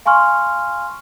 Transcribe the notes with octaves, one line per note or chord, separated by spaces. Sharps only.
F5 G#5 C6 C#6 F6